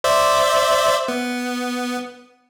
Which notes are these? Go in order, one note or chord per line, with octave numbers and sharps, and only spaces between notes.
C5 D5 E5
B3